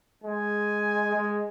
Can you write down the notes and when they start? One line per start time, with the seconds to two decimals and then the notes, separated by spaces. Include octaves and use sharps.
0.24 G#3 G#5
1.15 G#3